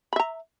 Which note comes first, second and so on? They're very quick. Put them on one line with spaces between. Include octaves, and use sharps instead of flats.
B5 E5 A#5